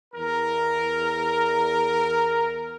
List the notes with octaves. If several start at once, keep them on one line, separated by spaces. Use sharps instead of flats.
E2 A#4